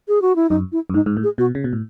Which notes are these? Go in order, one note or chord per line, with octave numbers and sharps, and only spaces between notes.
G#4
F#4
E4
F#2 D#4
E4
F#2
G#2 D#4
G#2
A2
G#4
B2 F#4
C#3
B2
A2